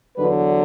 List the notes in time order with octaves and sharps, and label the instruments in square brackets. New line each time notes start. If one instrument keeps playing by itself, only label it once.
[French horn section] E2 D3 F#3 D4 B4